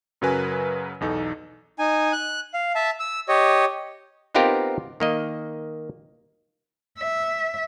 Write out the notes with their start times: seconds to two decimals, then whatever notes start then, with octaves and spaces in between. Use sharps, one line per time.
0.21 F#2 C#3 F#3 A#4 B4 G#5
1.00 B1 E2 D#4 A4
1.79 D#4 G#5
2.13 F#6
2.54 F5
2.75 E5 A5
3.00 E6
3.29 G4 C#5 D#5
4.34 B3 C4 D#4 F4 G4 A#4
5.00 D#3 A#3 D#5
6.99 E5